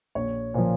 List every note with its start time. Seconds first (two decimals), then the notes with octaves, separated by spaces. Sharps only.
0.15 A#1 C#5
0.54 A#2 F3 C5